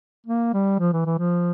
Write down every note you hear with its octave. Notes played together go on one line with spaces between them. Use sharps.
A#3
G3
F3
E3
E3
F3